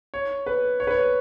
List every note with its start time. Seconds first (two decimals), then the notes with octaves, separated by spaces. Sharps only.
0.14 C#5
0.46 B4
0.80 C#5
0.87 B4
0.91 C#5